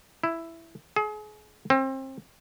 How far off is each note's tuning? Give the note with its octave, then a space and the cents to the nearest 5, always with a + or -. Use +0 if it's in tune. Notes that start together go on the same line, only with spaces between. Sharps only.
E4 +5
G#4 +35
C4 +30